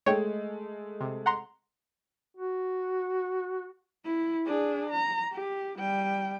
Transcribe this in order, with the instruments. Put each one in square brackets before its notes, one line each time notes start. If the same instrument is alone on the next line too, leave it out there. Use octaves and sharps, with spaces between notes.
[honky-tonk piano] G#3 A3 [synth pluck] C#5 G5
[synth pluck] C3
F#5 A#5 C6
[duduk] F#4
[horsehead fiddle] E4
D4 G#4
A#5
G4
G3 G5